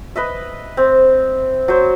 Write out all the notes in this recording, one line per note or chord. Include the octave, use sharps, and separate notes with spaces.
B4 D#5 E5
C4
F#3 C5